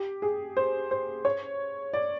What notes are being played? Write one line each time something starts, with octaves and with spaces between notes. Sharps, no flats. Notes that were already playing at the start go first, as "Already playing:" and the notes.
Already playing: G4
G#4
C5
C5
C#5
D5